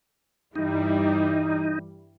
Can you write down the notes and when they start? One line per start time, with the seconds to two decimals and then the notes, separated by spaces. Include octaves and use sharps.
0.56 G2 E3 G3 D#4